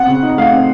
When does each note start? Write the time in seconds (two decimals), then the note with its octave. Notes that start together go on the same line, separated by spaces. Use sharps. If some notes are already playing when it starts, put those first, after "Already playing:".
Already playing: C4 F#5
0.08 C#3
0.23 D#4
0.37 A3 F5
0.53 C4